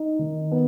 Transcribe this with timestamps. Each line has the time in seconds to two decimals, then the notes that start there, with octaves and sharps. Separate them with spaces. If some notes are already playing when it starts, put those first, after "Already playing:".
Already playing: D#4
0.19 D#3
0.52 B3